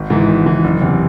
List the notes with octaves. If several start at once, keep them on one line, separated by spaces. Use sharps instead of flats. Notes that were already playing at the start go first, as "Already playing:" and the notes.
Already playing: G#1
G#2 E3
G#1
G#2 E3
F#1
E2 C3